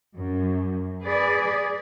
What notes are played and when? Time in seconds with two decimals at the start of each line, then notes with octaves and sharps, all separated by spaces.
0.16 F#2
1.02 G#4 B4 D5